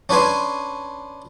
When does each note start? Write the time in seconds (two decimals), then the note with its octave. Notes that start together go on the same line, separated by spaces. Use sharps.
0.09 C#4 D4 B4 G#5 C6